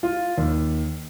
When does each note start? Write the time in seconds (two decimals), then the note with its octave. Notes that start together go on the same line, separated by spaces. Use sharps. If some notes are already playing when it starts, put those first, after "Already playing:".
0.03 F4
0.38 D#2